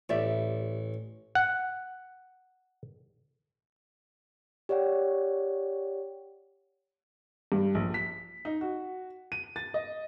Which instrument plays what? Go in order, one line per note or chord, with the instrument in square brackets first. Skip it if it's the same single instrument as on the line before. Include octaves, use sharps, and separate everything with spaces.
[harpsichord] A1 [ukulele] G4 D5 E5
[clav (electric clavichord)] F#5
[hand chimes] G4 C#5 D5 F#5 G5
[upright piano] G2
A#1
B6
D#4
F#4
D#7
A6
D#5